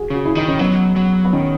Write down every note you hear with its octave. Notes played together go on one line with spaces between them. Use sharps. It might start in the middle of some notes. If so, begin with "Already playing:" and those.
Already playing: F#4 G#4
C#3 F#4
E4
D#3 D#4
C#4
F#3 B3
F#3
B3
D#3 C#4